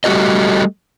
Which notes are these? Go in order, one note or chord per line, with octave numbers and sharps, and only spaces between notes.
G3 A3 F#4 G4 B4 D#5